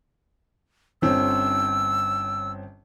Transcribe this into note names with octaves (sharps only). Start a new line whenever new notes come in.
G1 C4 C#4 E6